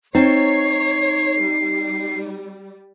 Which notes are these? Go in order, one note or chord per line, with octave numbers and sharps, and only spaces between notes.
C4 D#4 C#5 C7
G3